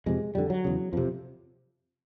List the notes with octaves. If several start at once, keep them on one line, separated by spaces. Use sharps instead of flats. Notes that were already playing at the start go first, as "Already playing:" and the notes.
F2 C3 G#3
F2 D3 G3
F#3
E2 C#3
F2 C3 F3